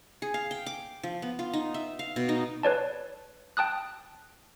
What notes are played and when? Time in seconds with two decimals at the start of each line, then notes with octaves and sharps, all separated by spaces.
0.22 G#4
0.34 F5
0.51 G5
0.66 D6
1.03 F3
1.22 B3
1.39 F4
1.53 D#4
1.74 E5
1.99 F5
2.16 B2
2.29 D#4
2.63 B4 C#5 D5 A5
3.57 G5 A5 D#6 F#6